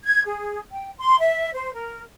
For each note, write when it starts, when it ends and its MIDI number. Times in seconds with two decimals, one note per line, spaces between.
0.04 0.21 92
0.24 0.59 68
0.70 0.91 79
0.98 1.20 84
1.20 1.51 76
1.54 1.71 72
1.74 2.01 70